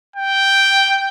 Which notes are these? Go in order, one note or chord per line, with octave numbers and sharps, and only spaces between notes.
G5